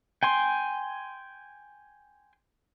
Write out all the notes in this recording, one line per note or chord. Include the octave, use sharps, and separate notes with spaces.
G5 G#5 C6